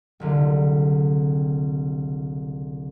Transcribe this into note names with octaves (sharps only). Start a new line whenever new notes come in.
F#1 C2 D3